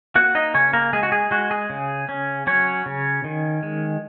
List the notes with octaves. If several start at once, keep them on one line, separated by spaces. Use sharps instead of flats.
A#3 F#4 F#5
D#4 D#5
C#3 C#4 C#5
A#3 A#4
G#3 G#4
F#4
G#4
G#3 F#4
G#4
C#3
C#4
F#3 C#4 C#5
C#3
D#3
G#3